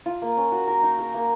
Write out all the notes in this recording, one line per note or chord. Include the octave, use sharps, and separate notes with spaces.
F4
A#3
C#4
F#4
A#4
D#4
A#4
A#3